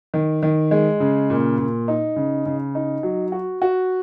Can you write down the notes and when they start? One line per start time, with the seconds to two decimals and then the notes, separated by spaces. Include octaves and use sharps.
0.14 D#3
0.43 D#3
0.71 G#3
1.00 C#3
1.30 A#2
1.58 A#2
1.88 D#4
2.16 C#3
2.46 C#3
2.75 D#4
3.03 F#3
3.32 F#4
3.62 F#4